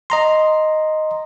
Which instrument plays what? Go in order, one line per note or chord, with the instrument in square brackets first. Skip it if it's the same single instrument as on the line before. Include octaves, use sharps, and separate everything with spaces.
[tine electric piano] D#5 A#5 C6